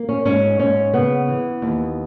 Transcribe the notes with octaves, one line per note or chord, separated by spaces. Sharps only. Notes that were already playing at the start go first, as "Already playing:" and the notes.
Already playing: A#3
C#4
G#2 C#4
G#2 C#4
C#3 B3
E3
D#2